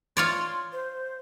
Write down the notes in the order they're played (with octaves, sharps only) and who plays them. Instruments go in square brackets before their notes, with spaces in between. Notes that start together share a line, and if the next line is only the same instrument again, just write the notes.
[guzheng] F4 C#5 D5 [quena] C6
[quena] C5